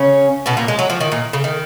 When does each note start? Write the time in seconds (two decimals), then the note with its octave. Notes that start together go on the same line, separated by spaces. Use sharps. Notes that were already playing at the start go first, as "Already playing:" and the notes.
Already playing: C#3 C#4
0.46 B2 B3
0.57 A#2 A#3
0.68 G#3
0.79 F#3
0.90 F3
1.01 D#3
1.12 A#2
1.33 C#3
1.44 D#3